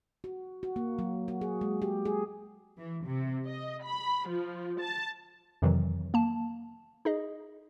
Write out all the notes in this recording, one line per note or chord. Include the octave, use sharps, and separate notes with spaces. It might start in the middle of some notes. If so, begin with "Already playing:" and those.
F#4
F#4
A#3
F#3
F#4
G#4
G#3
G4
G#4
E3
C3
D#5
B5
F3
A5
F2 C3 D#3 E3 F#3
A#3 A5
D#4 G#4 D#5